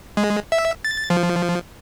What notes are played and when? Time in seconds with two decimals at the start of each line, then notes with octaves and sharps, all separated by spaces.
0.17 G#3
0.52 E5
0.85 A6
1.10 F3